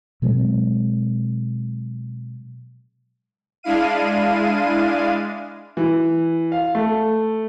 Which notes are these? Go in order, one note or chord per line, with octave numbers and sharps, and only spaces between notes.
B2 F#3 G#3 C4
G#3 D4 E4 F5 D#7
E3
F5
A3